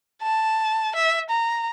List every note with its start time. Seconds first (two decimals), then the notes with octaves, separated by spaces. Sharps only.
0.22 A5
0.96 E5
1.30 A#5